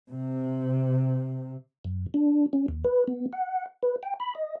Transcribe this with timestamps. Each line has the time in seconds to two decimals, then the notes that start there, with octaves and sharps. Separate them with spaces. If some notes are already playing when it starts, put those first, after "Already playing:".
0.10 C3
1.85 F#2
2.14 D4
2.53 C#4
2.68 D#2
2.85 B4
3.08 B3
3.33 F#5
3.83 B4
4.03 G5
4.20 B5
4.35 D#5